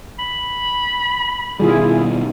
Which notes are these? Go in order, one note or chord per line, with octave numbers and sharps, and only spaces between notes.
B5
B2 D#3 G3 E4 F4 G#4